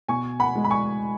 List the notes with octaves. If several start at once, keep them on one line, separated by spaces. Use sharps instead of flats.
B2 G#5 C#6
F#5 B5
G#3
B5
G#5 C#6